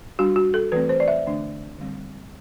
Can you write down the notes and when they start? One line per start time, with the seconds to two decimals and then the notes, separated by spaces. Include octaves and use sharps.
0.19 G3 D4 F#4
0.36 F#4
0.54 A4
0.72 E3 A3 C4 B4
0.89 C5
1.00 D5
1.08 E5
1.26 D3 A3 D4
1.78 D3 G3 C4